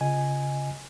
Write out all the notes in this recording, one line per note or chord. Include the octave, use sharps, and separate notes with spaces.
C#3 F4 D#5 G#5